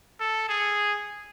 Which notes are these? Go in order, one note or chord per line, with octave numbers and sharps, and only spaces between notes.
A4
G#4